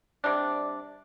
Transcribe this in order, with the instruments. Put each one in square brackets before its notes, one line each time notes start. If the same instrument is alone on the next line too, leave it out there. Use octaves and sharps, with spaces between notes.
[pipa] C3 G3 D4